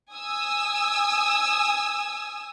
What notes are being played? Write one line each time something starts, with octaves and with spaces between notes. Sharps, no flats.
G#5 D#6 E6